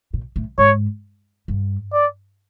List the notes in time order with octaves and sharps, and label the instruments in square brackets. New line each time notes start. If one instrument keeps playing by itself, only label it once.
[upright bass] A#2
A2
[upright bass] G#2 [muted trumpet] C#5
[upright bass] G2
[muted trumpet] D5